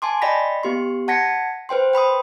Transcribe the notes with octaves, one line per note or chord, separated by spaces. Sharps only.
G#5 A5 C6 D6
D5 D#5 G5 B5 A#6 B6
B3 G4 C6
F#5 A5 G#6 A#6 B6 C#7
B4 C5 G5 C6
G5 B5 C6 D#6